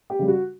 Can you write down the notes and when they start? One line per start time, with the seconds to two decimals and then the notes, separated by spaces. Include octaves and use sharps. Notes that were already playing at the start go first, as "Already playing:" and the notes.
0.10 G4
0.19 C#3 G3
0.28 F#4